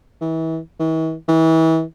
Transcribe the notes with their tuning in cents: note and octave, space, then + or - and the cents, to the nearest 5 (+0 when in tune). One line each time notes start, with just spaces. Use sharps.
E3 -30
E3 -45
E3 -30